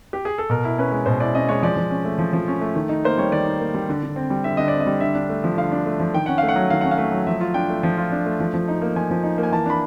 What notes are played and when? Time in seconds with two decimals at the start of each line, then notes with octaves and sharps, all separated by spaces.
0.13 G4
0.25 G#4
0.38 A4
0.50 B2 A#4
0.65 E4
0.78 C#4 B4
0.92 G#3
1.06 B2 C5
1.20 E4 D5
1.35 C#4 D#5
1.49 G#3 C#5
1.63 F3 D5
1.76 F3
1.91 C#4
2.05 A3
2.19 F3
2.33 F3
2.48 C#4
2.61 A3
2.75 D#3
2.89 D#4
3.04 A#3 C5
3.17 G3 C#5
3.32 D#3 D5
3.45 D#4
3.60 A#3
3.74 G3
3.89 D3
4.03 D3
4.16 C4
4.30 G3
4.44 D3 E5
4.57 D3 D#5
4.68 C4 D5
4.80 D#5
4.86 G3
5.00 D3 E5
5.15 D4
5.29 A3
5.44 F3
5.57 D3 F5
5.72 D4
5.86 A3
6.00 F3
6.13 D#3 G5
6.26 C#4 F#5
6.38 A3 F5
6.49 F#5
6.56 F#3
6.70 D#3 F5
6.81 C#4 F#5
6.91 F5
6.98 A3
7.12 F#3
7.27 F3 E5
7.41 F4
7.54 D4 G5
7.70 A3
7.83 F3
7.97 F4
8.12 D4
8.26 A3
8.40 F3
8.54 F3
8.68 D#4
8.82 A#3
8.96 F3 G#5
9.11 F3
9.24 D#4
9.38 A#3
9.43 G#5
9.52 E3 A5
9.66 D4 B5